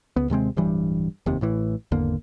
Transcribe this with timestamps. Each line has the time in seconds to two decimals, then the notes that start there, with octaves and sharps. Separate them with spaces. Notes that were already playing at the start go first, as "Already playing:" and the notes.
0.16 C#2 B3
0.30 D#2 C3 G#3 C4
0.57 D1 G2 E3 G3
1.26 F1 D#2 C3
1.41 A1 A2 E3
1.91 G#1 E2 D3 A#3